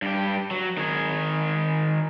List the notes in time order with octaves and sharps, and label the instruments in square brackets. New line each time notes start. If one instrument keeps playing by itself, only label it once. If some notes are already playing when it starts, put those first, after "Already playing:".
[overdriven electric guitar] G2 G4
F#3
D#3 G#4